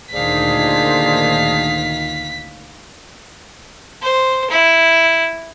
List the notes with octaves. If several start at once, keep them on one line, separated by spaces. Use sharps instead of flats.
D2 A#2 D#3 D4 G#4 C5 F5 B6
C5
E4